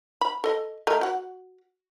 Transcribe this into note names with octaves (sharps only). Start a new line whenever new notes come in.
B5
A4 D#5
A3 A#4 D#5
F#4 F#5